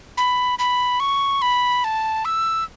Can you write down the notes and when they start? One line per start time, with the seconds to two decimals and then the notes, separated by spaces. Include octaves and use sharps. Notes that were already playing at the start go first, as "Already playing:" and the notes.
0.17 B5
0.59 B5
1.00 C#6
1.42 B5
1.84 A5
2.25 E6